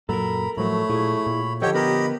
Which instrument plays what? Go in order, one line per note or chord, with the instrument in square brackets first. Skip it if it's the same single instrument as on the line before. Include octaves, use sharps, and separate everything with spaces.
[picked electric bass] F#2 A#2 F#3 [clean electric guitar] A4 A#4 [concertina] A#5 B5
[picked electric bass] A2 F3 F#3 [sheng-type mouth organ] A3 [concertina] C#5 B5
[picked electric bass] A#2 [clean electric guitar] E4 G#4
[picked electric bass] A#2
[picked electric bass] D3 F3 [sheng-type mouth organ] G4 C#5 G5 [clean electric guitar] A4 D#5 F#5
[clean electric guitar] B3 A#4 A#5 [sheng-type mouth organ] G4 D#5 [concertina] B5